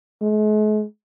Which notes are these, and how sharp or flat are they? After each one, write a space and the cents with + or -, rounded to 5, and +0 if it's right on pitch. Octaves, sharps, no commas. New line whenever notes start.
G#3 +45